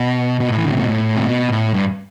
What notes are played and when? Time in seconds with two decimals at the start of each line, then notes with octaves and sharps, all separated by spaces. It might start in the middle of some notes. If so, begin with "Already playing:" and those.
Already playing: B2
0.40 B2
0.49 A2
0.57 E3
0.65 D3
0.72 C3
0.80 B2
0.87 A2
1.15 C3
1.24 B2
1.49 A2
1.74 G2